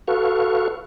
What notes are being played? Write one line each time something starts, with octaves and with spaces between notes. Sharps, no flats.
F#4 A4 B4 F5 C#6